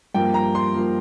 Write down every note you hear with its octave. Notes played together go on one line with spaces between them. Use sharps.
G2 F3 A#3 G5
A#5
C6
F3 A#3